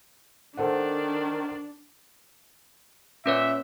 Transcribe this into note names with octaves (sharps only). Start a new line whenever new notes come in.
D#3 D4 A4 C5 F#5
A#2 C#4 B4 C#5 E5